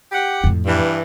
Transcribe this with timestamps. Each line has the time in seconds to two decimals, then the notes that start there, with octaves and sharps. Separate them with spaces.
0.12 G4 F#5
0.44 F2 A2
0.66 G2 E3